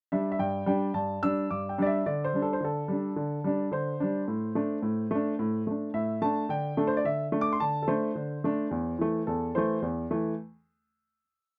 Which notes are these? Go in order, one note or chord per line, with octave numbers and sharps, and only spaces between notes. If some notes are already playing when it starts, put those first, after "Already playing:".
G3 D4 E5
E5
G2 G5
G3 D4 G5
G2 A5
G3 D4 E6
G2 D6
G5
G3 D4 D5
E5
D3 D5
C5
G3 D4
A4
C5
D3 A4
G3 D4
D3
G3 D4
D3 C5
G3 D4
A2
A3 D4
A2
A3 D4
A2
A3 D4
A2 E5
A3 D4 A5
D3 G5
A3 D4 A4
C5
D5
D3 E5
A3 D4
D6
C6
D3 A5
A4
A3 D4 C5
D3
A3 D4
E2
E3 A3
E2 A4
E3 A3 C5
E2
E3 A3